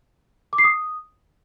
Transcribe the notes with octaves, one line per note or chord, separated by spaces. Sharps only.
D6
C7
D#6